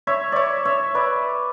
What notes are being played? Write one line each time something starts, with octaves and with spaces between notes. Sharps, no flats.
C#5 E5
C#5 D5 E5
C#5 E5
B4 D5